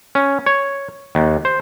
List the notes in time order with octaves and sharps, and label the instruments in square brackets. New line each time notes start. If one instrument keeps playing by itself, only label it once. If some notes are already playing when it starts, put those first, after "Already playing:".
[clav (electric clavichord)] C#4
C#5
D#2
C5